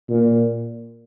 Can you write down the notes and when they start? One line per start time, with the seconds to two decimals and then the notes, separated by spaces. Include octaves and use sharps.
0.09 A#2